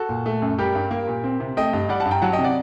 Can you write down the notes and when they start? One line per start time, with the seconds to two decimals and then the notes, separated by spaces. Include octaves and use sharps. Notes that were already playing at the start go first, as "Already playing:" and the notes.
Already playing: F#4 A4
0.09 A#2
0.26 A3
0.42 F#2
0.58 G3 G4 A#4
0.75 G2
0.91 A#3
1.08 A#2
1.24 C4
1.40 C3
1.57 A3 D#5 G5
1.73 G2
1.89 G3 D5 F#5
2.00 F#5 A5
2.05 G2
2.11 G5 A#5
2.22 F#3 F#5 A5
2.33 D#5 G5
2.39 C3
2.44 D5 F#5